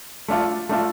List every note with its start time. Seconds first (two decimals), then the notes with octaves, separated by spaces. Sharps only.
0.28 A3 D4 F4
0.69 A3 D4 F4